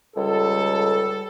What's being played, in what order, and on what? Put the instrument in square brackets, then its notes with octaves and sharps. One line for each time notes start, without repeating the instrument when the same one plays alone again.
[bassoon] C#2 [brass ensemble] G3 A4